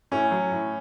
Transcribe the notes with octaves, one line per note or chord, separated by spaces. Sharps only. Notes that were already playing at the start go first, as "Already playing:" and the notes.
A2 C#4
F#3
A2